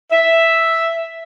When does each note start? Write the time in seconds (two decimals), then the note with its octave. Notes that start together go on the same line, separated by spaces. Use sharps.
0.12 E5